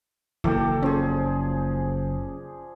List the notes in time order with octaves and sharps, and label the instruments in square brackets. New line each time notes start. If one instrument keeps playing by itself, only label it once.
[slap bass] F#1 A#3 [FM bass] E3 [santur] A4 D5 G5
[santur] F3 G#4 [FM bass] C#4